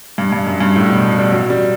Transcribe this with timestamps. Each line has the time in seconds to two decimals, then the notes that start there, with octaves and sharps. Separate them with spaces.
0.18 G2
0.32 G2
0.47 F#2
0.61 G2
0.76 A2
0.89 B2
1.18 G3
1.32 F#3
1.50 G3